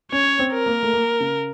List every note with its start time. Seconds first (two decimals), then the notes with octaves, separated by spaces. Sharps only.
0.12 C#4 C#5
0.39 C4
0.53 A#4
0.66 A#3
0.83 A3
0.93 A#3
1.20 C#3